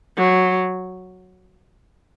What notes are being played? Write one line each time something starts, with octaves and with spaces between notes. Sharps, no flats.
F#3